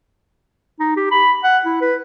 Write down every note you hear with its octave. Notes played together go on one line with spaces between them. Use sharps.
D#4
G4
B5
F#5
E4
B4